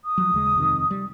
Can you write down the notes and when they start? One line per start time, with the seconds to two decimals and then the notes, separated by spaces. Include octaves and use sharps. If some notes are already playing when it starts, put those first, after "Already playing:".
0.05 D#6
0.18 F3 F#3
0.34 D#2 C#3 G#3
0.55 F2 C3 D#3
0.91 G3